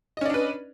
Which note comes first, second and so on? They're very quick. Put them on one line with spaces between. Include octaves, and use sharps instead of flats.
D#5 C#4 D5 D4 B4